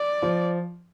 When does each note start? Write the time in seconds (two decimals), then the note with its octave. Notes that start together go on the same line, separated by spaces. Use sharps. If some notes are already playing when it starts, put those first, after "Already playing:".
Already playing: D5
0.22 F3